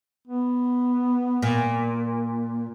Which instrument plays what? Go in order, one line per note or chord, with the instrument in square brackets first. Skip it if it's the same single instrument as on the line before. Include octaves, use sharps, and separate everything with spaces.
[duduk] B3
[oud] A#2